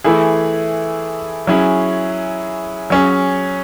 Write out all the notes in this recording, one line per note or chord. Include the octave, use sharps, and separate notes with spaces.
E3 A3 E4 G#4
F#3 C#4 E4 G#4
F#3 C#4 G#4